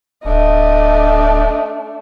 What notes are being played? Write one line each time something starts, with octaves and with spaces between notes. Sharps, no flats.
D1 A3 D4 D#5